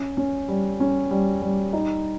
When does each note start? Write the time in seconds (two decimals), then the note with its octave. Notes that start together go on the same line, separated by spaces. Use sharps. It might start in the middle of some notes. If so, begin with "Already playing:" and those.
Already playing: C#4
0.17 C#4
0.48 G3
0.80 C#4
1.11 G3
1.42 G3
1.73 D#4